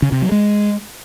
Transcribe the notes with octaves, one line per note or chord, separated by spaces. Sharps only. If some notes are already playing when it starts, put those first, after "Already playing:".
C#3
C3
F#3
G#3